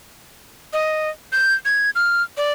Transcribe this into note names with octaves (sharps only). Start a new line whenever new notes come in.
D#5
G6
G#6
F6
D5